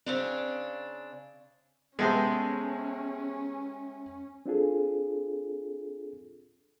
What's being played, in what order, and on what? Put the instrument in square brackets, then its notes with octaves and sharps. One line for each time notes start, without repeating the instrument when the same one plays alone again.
[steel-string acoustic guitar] C#3 C4 D4
[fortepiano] C3 G#3 [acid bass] B3 [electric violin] C#4 [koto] G#4 A4 C5
[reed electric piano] C4 D4 F4 G#4 A4